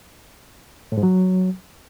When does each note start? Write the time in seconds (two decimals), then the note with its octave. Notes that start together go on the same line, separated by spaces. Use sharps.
0.92 A2
0.98 G#2
1.03 F#3